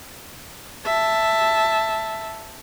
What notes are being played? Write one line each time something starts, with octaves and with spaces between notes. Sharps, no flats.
E5 A5